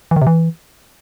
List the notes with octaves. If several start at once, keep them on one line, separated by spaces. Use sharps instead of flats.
E3
D#3
C3
E3